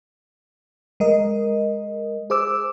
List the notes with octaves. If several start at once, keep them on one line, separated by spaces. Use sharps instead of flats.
G#3 A#4 D#5
G#4 C5 D6 E6